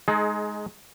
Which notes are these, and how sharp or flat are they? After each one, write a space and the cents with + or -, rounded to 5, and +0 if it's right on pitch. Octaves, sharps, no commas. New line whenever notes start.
G#3 +15 D#4 +0 G#4 +35